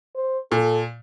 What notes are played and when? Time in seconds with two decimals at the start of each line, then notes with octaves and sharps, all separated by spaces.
0.15 C5
0.52 A#2 A4